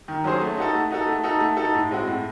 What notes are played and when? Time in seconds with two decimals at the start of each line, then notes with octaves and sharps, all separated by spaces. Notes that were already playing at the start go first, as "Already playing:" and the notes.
0.08 D#3
0.24 F#3 C#4 G#4 C5
0.41 A3
0.57 D#4 F#4 A4
0.74 A3
0.91 D#4 F#4 A4
1.08 A3
1.24 D#4 F#4 A4
1.40 A3
1.57 D#4 F#4 A4
1.75 A2
1.91 G#3 C4 F#4
2.07 A2